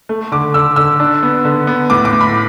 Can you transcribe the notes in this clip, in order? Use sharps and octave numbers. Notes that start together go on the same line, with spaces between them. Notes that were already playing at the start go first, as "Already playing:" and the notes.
A3
D3 D6
D3 E6
D3 E6
D4
B3
D3
B3
A2 D6
D6
A2
B5